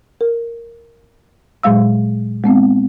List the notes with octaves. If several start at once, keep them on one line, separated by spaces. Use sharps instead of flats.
A#4
A#2 F#3 G#3 F5 E6
G#3 B3 C4